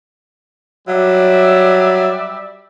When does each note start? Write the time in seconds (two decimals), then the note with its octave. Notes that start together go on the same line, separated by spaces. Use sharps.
0.88 F#3 G3 D5 E5